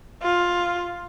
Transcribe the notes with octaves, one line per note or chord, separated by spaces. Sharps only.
F4